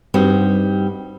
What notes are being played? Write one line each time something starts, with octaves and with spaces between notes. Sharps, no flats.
G2 G3 C4 D#4 F#4